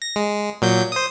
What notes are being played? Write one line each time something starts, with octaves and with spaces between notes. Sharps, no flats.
A#6
G#3
A#2 F#3 G6
C5 D#6